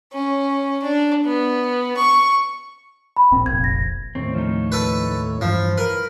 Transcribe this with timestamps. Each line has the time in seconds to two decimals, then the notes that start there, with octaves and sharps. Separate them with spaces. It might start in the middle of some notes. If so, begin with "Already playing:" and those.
0.12 C#4
0.83 D4
1.25 B3
1.97 C#6
3.16 B5
3.31 D1 A#1 C4
3.46 F1 A#1 G#6
3.64 A#6
4.15 D#2 A2 C4 C#5
4.34 F3 A3 D#4
4.72 A4 B4
5.41 G2 E3 F3
5.78 A#4 B4